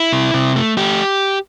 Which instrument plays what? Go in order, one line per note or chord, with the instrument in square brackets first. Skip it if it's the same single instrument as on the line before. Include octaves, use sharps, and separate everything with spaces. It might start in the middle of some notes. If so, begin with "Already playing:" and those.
Already playing: [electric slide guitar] E4
C3
C3
A3
A3 G4